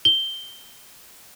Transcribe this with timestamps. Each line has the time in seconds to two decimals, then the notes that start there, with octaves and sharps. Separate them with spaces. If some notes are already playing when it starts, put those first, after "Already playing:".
0.05 G7